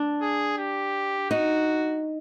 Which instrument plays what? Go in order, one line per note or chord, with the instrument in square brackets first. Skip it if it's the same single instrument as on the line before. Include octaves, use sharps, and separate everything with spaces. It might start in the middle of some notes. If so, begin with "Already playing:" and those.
Already playing: [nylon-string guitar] D4
[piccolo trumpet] G#4
G4
[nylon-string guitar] D#4 [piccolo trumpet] F#4